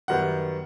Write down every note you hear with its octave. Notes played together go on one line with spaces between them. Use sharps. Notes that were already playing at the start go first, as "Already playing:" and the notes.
F#2 D#3 G3 B3 F#5